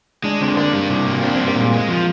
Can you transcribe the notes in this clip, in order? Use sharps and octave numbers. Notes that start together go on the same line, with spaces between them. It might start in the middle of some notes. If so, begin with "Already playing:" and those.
G#3 D4
D3 C4
A#3 D4
G3
C3
A#3
C4 D4
C4
G3
A#3
A#2 G#3
G#3
F3